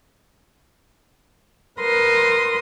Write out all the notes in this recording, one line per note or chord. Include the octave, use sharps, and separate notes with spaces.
A#4 B4 C6 D#6